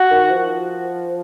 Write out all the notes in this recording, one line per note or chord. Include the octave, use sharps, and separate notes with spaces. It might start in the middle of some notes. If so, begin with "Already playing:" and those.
Already playing: F#4
D#3
F3